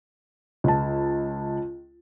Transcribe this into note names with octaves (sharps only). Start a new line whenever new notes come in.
C#2 A5